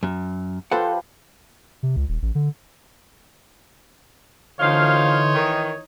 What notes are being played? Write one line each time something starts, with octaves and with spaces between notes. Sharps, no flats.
F#2
F3 G4 A4 B4 C5 F#5
C3
C#2
D#1
A1
D3
D2 D3 E3 F3 D#4 C#5 F5 C6
D#3